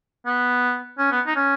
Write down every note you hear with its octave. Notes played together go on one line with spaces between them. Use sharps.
B3
C#4
B3
D#4
C#4